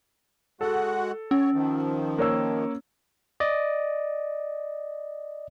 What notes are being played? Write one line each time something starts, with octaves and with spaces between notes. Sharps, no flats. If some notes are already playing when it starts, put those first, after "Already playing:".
G#3 F#4 A4 F#5
C#4 C#5
D#3 F3
A#3 C#5 E6
D5 D#5